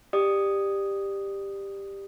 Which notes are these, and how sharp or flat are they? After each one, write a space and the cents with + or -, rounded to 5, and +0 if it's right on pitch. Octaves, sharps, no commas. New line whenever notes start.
G4 +10 D5 +20 D#6 +0